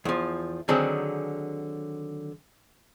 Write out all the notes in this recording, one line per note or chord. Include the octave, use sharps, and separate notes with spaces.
E2 F3
D3 D#3 F#3 C4 G#4 A5